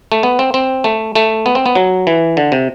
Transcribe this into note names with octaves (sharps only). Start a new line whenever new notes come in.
A3
B3
C4
C4
A3
A3
B3
C4
B3
F#3
E3
D3
C3